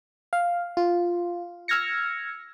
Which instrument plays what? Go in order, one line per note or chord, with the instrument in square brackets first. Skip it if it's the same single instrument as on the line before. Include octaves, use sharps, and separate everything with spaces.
[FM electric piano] F5
F4
E6 F6 G#6 A#6 C#7